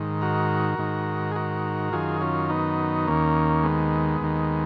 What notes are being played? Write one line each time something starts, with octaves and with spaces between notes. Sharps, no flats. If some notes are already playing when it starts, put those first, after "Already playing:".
Already playing: G#2 D#3
F#4 A#4
G#2 D#3
G#4
F#4 A#4
F#2 D#3 F4 G#4
C#4 F4
B3 D#4
D#2 D#3 A#3 C#4
G#3 B3
D#2 D#3